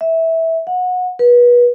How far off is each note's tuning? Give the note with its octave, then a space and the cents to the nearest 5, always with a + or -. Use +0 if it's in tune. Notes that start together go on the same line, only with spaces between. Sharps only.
E5 -15
F#5 -25
B4 -30